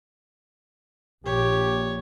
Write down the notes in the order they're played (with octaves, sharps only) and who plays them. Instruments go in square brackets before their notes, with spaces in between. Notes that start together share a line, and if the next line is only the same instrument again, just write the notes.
[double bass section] A#1 [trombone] G4 [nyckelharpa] C#5